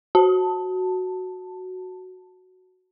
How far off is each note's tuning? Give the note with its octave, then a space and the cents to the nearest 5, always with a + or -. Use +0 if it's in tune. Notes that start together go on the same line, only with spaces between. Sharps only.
F#4 +0 A5 +10